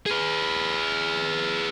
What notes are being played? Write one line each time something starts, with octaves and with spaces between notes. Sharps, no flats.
G#4 B4